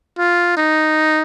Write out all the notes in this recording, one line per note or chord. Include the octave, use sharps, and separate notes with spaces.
F4
D#4